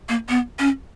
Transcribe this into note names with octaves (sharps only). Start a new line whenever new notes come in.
A#3
B3
C#4